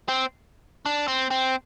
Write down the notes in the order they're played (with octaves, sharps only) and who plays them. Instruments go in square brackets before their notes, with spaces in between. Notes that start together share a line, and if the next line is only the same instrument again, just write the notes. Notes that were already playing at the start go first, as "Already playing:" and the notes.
[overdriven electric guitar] C4
D4
C4
C4